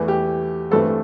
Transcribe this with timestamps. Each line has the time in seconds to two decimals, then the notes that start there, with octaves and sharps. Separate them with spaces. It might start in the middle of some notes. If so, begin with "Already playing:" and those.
Already playing: E2 E3 A3
0.08 G4
0.71 G2 E3 A3 C4 A4